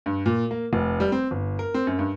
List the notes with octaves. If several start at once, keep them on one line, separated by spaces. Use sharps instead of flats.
G2
A#2
A#3
F1
G3
C4
G1
A#4
C4
F#2
G2